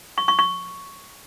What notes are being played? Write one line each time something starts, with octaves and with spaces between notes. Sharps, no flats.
C#6
C#6
C#6